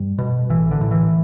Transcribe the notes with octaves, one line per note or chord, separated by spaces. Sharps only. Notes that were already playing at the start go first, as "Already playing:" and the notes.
Already playing: G2 G3
B2
A1 E3
D3
A2
E3